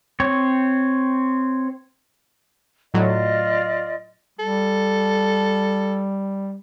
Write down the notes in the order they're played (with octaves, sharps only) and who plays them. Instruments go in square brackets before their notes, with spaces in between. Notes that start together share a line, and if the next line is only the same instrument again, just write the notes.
[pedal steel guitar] C4 C#5
[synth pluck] A2 F#3 [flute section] F4 D5 D#5
[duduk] G3 [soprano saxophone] A4